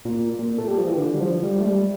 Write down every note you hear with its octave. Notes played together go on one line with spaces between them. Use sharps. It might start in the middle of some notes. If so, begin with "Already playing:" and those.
A#2
A#2
A3
G3
F3
E3
D3
G3
F3
G3
A3
G3